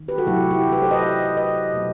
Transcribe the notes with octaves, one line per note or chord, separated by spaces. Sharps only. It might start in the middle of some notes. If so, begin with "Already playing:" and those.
Already playing: D#3
G4 B4
F#4 A4
C3 F#3 A3 E4 G4
E4 G4
G4 B4
A4 C5
B4 D#5
B4 D#5
B2 F#3 A3